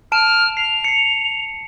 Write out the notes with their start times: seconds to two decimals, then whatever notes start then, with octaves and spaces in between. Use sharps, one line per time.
0.12 A5 F6 D7 E7
0.57 C7 F7
0.84 C7 C#7